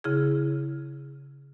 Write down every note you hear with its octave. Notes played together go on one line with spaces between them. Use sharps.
C#3 E4 G#4